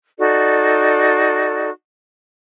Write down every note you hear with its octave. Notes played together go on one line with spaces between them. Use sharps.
D#4 F#4 A4 D5